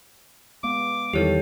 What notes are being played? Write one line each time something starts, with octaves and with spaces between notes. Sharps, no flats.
G#3 B3 F5 D6
E2 D#3 E3 G3 G4 A4 C#5